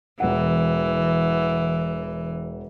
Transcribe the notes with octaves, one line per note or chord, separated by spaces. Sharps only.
E1 E3 F#5